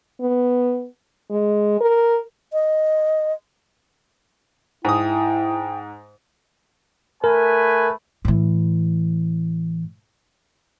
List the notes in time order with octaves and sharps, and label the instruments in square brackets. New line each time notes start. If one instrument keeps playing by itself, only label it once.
[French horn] B3
G#3
A#4
[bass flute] D#5
[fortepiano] G#2 D#6 [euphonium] E4 [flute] G5
[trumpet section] A3 B4 G#5 [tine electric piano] A#4
[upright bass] A2 E3